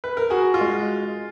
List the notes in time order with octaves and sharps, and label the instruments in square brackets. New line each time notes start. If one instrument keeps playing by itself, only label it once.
[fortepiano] B4
A#4
[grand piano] F#4 [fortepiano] G#4
[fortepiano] F4
[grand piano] G#3